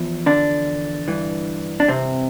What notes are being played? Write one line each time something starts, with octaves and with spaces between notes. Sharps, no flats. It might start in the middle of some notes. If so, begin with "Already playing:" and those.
Already playing: E2 F3
D3 D4
G2 E3
D4
C3 C4